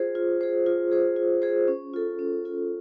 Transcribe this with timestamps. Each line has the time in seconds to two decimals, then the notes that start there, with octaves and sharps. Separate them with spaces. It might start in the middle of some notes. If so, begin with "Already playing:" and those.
Already playing: F4 G#4 C5
0.15 F4
0.41 G#4 C5
0.66 F4
0.92 G#4 C5
1.16 F4
1.42 G#4 C5
1.68 C#4
1.94 F4 A4
2.19 C#4
2.45 F4 A4